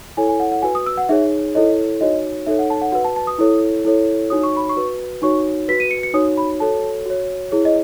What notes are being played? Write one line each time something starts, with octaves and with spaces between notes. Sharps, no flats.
E4 A4 C#5 G#5
G#5
F#5
F#5
F#4 B4 G#5
D#6
E6
F#5
D#4 G#4 C#5 E5
E4 A4 C#5 D#5
D#4 F#4 C#5 D#5
D#4 A4 C#5 E5
F#5
A5
F#5
F#4 B4 F#5
A5
A5
D#6
E4 A4 C#5
E4 A4 C#5
D#4 F#4 C#5 D#6
C#6
B5
C#6
F#4 B4
D#4 F#4 C#5 C#6
F#4 B4 B6
D#7
C#7
C#7
D#4 F#4 C#5 D#6
B5
F#4 A4 C#5 A5
F#4 C#5
E4 G#4 C#5
D#5